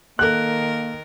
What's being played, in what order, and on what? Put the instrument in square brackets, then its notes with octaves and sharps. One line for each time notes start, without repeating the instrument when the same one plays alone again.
[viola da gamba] D#3 A#4 [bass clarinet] A#3 [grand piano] A4 F#6